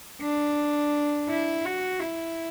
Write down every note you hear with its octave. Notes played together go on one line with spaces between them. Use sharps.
D4
E4
F#4
E4